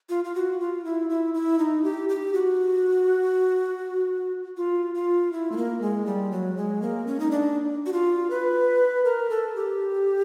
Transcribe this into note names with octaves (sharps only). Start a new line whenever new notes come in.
F4
F4
F#4
F4
E4
E4
E4
D#4
G4
G4
F#4
F4
F4
E4
A3
A#3
G#3
G3
F#3
G#3
A#3
C#4
D#4
D4
F#4
F4
B4
A#4
A4
G4